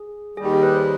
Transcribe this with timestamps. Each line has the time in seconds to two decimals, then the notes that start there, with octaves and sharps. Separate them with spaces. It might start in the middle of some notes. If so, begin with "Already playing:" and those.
Already playing: G#4
0.37 D#2 D#3 G3 G#4
0.45 G4
0.54 G#4
0.63 B4
0.77 C5